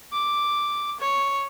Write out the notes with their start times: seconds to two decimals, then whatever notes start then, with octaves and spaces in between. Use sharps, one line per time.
0.13 D6
1.00 C#5